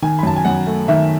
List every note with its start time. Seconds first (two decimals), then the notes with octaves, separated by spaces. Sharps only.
0.02 D#3 G#5
0.19 B5
0.23 F#2 A5
0.36 G#5
0.45 F#2 F#5
0.66 A3
0.88 D#3 E5